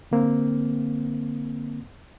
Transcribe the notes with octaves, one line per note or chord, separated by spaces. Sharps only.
D3 A#3 C4